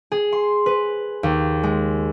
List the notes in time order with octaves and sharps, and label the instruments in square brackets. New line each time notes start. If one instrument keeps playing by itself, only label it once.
[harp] G#4
C6
B4
D#2
G#3